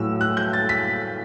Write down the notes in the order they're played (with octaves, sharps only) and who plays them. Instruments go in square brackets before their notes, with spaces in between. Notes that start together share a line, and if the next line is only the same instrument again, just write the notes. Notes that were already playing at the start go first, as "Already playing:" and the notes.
Already playing: [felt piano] A2 F#3 A3 E6
F#6
G6
A6
B6